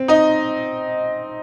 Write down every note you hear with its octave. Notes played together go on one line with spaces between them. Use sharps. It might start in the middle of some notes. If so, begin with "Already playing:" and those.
Already playing: C4
D#4 D#5